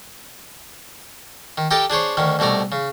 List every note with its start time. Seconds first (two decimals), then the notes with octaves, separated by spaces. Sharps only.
1.58 D#3
1.71 G4 A4 A#4 D#5 G5 A5
1.90 D4 G#4 C5 C#5
2.17 D2 D#3 C#4
2.39 C2 B2 A3 D5 A#5
2.72 C#3